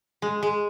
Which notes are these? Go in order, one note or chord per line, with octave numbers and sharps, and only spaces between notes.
G#3
G#3